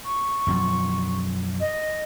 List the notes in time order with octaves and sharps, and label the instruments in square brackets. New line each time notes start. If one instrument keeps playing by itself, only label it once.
[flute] C#6
[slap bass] F#2 B2 F3
[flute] D#5